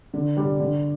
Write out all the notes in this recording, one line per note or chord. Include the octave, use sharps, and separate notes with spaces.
D3
G3 D4
D3